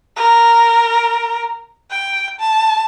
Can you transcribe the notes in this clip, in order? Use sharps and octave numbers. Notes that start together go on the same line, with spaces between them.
A#4
G5
A5